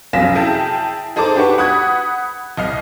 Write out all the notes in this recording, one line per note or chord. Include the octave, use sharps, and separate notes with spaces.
F1 F#2 F5 A#6 B6 E7
E4 G#4 G5 A5
D#4 G#4 A4 C5 D6
D4 G4 B4 F#5 C#6
F#5 B5 D#6 F#6 G#6
C2 D#5 F6 C7